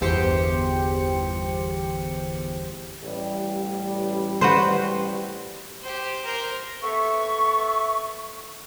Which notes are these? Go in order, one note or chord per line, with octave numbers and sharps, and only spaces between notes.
G1 E2 G4 C5 G5 C#7
A1 G3
F#4 B4 C5
G4 C5
A#4 C5
B3 A4 E5 C#6